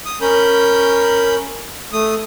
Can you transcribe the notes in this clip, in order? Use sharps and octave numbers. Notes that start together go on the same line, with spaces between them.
D#6
C#4 A#4 B5 G6
A3 D#6